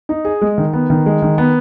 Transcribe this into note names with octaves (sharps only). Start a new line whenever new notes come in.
D#4
G#4
G#3
D#3
B3
D#3
G#3
D#3
B3